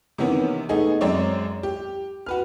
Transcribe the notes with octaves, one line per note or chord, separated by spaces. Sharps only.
C3 D#3 E3 A#3 B3 C#4
A3 B3 D#4 G#4
F#2 G#3 C4 C#5 D5
G4
F#4 B4 F6